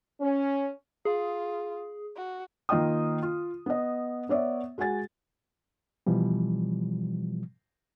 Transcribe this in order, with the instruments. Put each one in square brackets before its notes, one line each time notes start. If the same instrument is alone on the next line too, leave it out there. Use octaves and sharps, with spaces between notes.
[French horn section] C#4
[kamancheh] F4 [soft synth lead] G#4
[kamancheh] F#4
[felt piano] D#3 A#3 F4 D#5 G5 D#6
F4
B3 D#5
B3 C#5 D5 E5
G#3 F#4 F#5 G#5 A6
[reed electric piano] B2 E3 F3 G3